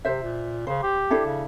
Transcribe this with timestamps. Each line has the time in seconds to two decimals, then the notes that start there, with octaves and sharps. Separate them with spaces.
0.05 C3 C5 E5
0.22 A#2
0.67 C#3 C5
0.83 G4
1.10 D4 E4 A4
1.25 C#3